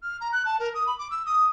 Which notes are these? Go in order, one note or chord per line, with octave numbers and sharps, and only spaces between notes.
F6
A#5
F#6
A5
A#4
D#6
B5
D6
E6
D#6